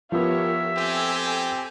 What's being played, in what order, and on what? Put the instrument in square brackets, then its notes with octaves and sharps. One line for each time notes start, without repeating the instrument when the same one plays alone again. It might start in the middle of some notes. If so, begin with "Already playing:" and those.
[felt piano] F3 B3 [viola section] G4 A#4 C#5 [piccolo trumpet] E5
[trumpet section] C4 G4 [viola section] A4 G#5